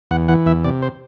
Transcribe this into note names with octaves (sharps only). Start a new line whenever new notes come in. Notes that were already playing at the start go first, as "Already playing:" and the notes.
E2 F#5
E3 F#5
E2 E5
C3 D5
C5